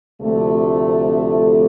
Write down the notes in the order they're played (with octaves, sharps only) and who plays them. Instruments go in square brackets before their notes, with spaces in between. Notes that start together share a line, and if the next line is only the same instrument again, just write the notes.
[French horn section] D2 C3 F3 A3